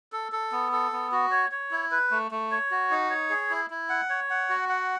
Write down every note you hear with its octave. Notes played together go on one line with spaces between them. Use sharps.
A4
A4
B3
A4
B3
F#4
C#5
C#5
E4
B4
A3
A3
C#5
F#4
D#4
C#5
G#4
E4
E4
F#5
C#5
F#5
F#4
F#5